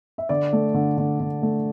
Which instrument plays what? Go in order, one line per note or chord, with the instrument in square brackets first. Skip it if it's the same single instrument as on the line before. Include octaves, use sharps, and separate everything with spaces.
[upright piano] E5
D3 D5
A3
D3
D3
D3
A3